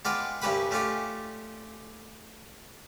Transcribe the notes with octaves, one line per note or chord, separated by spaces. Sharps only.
G#3 B3 F4 D5 F5 G5
C2 G2 C#4 G4 B4 B5
A3 C#4 D4 F4 G4